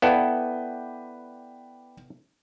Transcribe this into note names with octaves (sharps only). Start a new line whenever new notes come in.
B3 E4 A4 B4 D5 G5